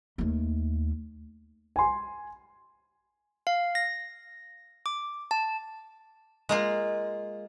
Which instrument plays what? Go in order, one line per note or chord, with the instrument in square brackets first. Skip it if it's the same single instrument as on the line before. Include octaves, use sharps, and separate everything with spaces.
[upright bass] D#2 A3
[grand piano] G#5 C6
[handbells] F5
A#6
D6
A5
[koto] G#3 A#3 F4